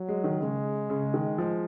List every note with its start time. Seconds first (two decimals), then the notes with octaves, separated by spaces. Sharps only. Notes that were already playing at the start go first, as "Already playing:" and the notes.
Already playing: F#3
0.08 G#3
0.24 D#3
0.41 C#3 G#3
0.90 C#3
1.14 D#3
1.38 F3